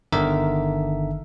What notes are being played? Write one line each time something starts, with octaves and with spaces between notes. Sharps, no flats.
G1 D3 D#3 A#4 E5